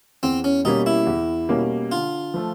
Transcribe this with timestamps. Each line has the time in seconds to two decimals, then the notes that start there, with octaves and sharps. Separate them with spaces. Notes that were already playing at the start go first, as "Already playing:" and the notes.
0.23 E2 C4
0.44 C#4
0.65 B2 G3 A#3 C#4 D#4
0.86 E4
1.07 E2
1.49 B2 G3 A#3 C#4
1.91 D3 F4
2.34 F3 A3